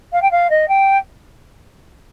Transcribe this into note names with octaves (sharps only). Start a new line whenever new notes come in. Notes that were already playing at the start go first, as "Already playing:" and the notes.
F5
G5
F5
D#5
G5